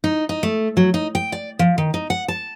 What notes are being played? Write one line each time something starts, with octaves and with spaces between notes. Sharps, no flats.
D#4
D#4
A3
F#3
D#4
G5
D5
F3
D#3
D#4
F#5
A5